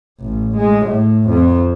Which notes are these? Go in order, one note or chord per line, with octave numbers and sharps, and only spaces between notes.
A1
G#3
A2
F2